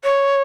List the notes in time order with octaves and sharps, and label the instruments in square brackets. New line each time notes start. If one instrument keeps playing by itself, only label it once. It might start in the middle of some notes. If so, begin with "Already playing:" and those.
[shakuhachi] C#5